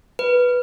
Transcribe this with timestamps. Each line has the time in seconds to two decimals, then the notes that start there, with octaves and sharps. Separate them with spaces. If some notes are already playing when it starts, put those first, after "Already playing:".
0.19 B4